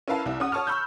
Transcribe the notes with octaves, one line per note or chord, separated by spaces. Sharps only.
C#4 E4 A#4 B4 F5 A5
C2 E4
C#4 F#5 D#6
C#5 A5 C#6 D#6 F6
B5 C#6 E6 F6 G6